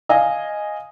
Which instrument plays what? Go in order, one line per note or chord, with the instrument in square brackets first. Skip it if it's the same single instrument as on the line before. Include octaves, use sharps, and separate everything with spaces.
[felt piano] D#5 F5 G#5